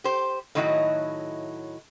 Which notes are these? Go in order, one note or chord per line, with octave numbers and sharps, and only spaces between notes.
G4 C5
A2 D#3 F#3 D#4 E4 F#4